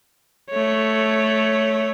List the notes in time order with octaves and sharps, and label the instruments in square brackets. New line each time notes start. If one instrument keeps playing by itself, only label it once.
[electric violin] A3 C#5